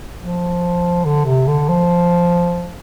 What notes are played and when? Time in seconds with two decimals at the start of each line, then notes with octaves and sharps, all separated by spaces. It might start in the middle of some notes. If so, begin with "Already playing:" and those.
0.18 F3
1.05 D3
1.26 C3
1.47 D3
1.69 F3